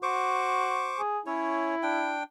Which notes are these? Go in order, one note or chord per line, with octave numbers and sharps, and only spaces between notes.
F#4 C5 C#6 D6
G#4
C#4 E4 C#5
D4 G5